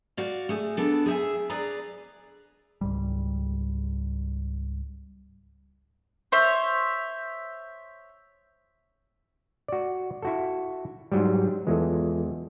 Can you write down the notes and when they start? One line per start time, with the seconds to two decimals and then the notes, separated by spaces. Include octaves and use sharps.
0.17 F#4 D5 F5
0.49 A3 G#4
0.77 B3 D4 A4
1.06 G#4 E5 G#5
1.50 G#4 B4 D5 A#5
2.81 C#2 G#2 G3
6.32 C5 C#5 E5
9.68 F#4 D5
10.22 E4 F#4 A4
11.12 G#2 F#3 G3
11.67 E2 E3 G#3 F4 A4